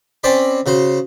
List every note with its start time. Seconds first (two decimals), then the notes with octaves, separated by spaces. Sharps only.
0.24 C4 C#4 C5 D5 B5
0.66 C#3 F#4 C5